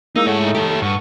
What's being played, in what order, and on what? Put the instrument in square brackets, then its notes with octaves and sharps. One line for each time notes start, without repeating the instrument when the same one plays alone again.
[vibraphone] G#3 E4 G#4 [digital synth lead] A#3 [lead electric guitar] D#4 [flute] E6
[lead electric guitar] G#2 C#5 [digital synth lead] A3 [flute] F#5
[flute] D#4
[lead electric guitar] G4 C#5 [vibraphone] A5
[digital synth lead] A3
[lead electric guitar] G2 [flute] F#5 [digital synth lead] C#6